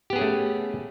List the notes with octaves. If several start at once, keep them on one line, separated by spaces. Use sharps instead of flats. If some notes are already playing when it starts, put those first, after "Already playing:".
A3 B3 C#4 G4 G#4